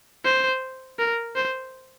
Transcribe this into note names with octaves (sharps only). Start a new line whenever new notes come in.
C5
A#4
C5